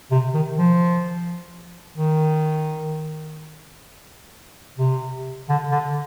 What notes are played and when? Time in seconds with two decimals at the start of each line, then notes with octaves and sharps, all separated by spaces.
0.11 C3
0.34 D#3
0.58 F3
1.97 D#3
4.78 C3
5.49 D3
5.71 D3